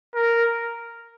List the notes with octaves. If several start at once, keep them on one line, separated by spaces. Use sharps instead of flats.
A#4